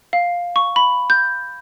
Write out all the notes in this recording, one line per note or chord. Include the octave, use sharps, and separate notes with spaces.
F5
C#6
B5
G6